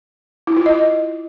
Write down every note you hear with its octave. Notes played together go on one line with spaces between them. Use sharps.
E4
F4
D#5